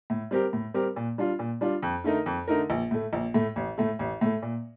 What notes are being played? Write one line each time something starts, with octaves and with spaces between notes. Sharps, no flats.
A2
G3 C4 G4 A#4
A2
G3 C4 G4 A#4
A#2
G3 D4 F4
A#2
G3 D4 F4
F2
D3 A3 D#4 A#4
F2
D3 A3 D#4 A#4
A#1
A2 A3
A#1
A2 A3
A1
A2 A3
A1
A2 A3
A#2